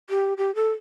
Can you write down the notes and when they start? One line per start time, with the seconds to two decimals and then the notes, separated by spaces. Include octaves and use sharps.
0.10 G4
0.37 G4
0.55 A4